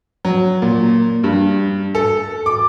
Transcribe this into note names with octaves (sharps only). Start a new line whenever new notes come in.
F#3
A#2
G2
A4
D6